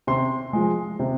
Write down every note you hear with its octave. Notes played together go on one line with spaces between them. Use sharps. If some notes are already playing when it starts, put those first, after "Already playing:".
C3 C6
F3 G#3
C3